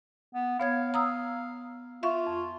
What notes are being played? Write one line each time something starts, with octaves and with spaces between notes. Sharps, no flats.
B3
B3 C#5 F5 G#6
A#5 D#6 E6
F4 E5 F5 C#6
F2